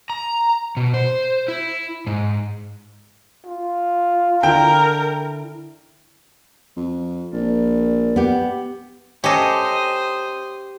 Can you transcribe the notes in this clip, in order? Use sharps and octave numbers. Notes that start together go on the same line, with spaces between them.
A#5
B2
C5
E4
G#2
F4
D3 E4 A#4 G5
F2
A#1 A#4 D5
B3 G4
C#4 G4 A4 C5 D#5 D#6